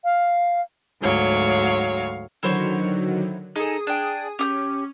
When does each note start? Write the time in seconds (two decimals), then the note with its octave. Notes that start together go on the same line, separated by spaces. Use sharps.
0.04 F5
1.02 D2 G#2 F#3 C#5 F5
2.43 D3 D#3 F#3 E4 C5 C#5
3.56 D#4 G#4 A4 D#6
3.87 D4 G5
4.39 C#4 G4 D#6 G6